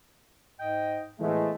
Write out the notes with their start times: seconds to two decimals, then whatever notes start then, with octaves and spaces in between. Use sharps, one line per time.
0.60 G#2 D#5 G5
1.19 A2 E3 F3 G#3 A3 B3